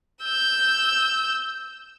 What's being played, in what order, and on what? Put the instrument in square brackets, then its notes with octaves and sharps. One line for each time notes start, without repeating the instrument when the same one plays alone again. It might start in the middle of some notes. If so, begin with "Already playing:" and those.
[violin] E6 G6